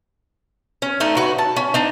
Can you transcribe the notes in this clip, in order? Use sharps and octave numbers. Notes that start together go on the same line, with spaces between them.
C#4
A3 D4 D#4
F#4 B4
A5
C#4
D4 D#4